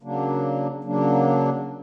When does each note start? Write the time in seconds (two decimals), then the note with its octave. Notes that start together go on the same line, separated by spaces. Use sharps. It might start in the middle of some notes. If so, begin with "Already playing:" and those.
0.02 C#3 F#3 A#3 D4
0.84 C#3 F#3 A#3 D4